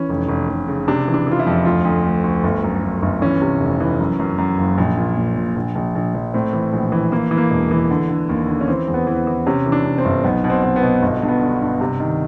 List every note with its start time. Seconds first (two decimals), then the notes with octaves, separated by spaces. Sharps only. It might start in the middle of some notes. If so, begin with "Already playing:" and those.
Already playing: E3 C#4
0.09 F1
0.28 F1
0.49 F1
0.68 C#3
0.88 C3 D4
1.08 E3
1.14 D4
1.27 E3 F4
1.39 E4
1.47 F2
1.65 D2 F4
1.85 D2
2.05 D2
2.24 D2
2.44 G1
2.64 F#2
2.82 G1
3.02 G1
3.22 E3 C#4
3.42 C3
3.61 F1
3.80 E3
4.00 F#2
4.20 F#2
4.38 F#2
4.58 F#1
4.78 A#1
4.97 A#2
5.17 A#2
5.36 A#2
5.56 A#1
5.76 A#1
5.96 A#1
6.14 A#1
6.34 A2 C4
6.53 E3
6.73 A#1
6.92 E3
7.12 E3 A#3
7.31 E3
7.38 A#3
7.51 E1
7.71 E3
7.91 D3
8.10 D3
8.29 D#2
8.49 D3
8.61 C#4
8.68 E3 C4
8.88 E2
8.94 B3
9.07 E3
9.27 E3
9.47 C3 C#4
9.66 E3
9.72 D4
9.86 C3
9.98 C4
10.05 G1
10.24 B1 B3
10.44 B2
10.50 C4
10.63 B2
10.76 B3
10.83 B2
11.02 G1
11.22 G2
11.28 B3
11.41 D3
11.61 G2
11.81 C3
12.00 D#3